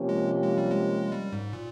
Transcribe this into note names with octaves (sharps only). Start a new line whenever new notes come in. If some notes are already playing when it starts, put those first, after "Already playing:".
Already playing: C3 F3 A#3 C#4 G4
G#3
G#3
G3
G#3
G3
G#2
A#2